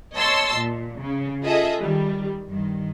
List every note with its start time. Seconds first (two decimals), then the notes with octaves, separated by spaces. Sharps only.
0.15 C#5 D#5 A5 C6 E6 A6
0.56 A#2
1.00 C#3
1.44 F4 G#4 A4 D#5 E5
1.81 D#3 G3
2.48 G2 D#3